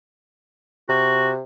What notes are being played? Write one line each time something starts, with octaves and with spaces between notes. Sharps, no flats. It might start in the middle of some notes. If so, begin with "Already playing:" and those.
C3 F#4